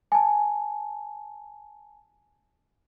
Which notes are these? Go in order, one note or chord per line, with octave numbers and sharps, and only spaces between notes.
G#5 A5